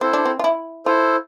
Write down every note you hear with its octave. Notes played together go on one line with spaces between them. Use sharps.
C4 E4 A4 C5
D4
C4
F4
E4
E4 F4 A4 C5